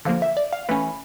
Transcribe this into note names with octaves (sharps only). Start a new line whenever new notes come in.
D3 F3 A#3 F5
E5
D5
F5
E3 A3 C#4 B5